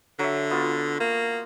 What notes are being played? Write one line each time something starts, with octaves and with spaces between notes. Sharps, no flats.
D3 F#3 E5
B3 F4 F#4
A#3